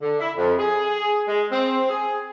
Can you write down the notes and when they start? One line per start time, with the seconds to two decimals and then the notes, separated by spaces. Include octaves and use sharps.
0.01 D3
0.20 E4
0.37 F2
0.59 G#4
1.28 G#3
1.52 C4
1.90 G#4